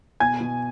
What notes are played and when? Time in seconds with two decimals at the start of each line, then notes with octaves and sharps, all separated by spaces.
0.20 B2 G#5 G#6
0.41 B2